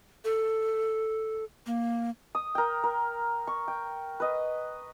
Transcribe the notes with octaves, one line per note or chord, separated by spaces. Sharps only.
A4
A#3
D#6
A#4 G5
A#4
C#6
G5
B4 D#5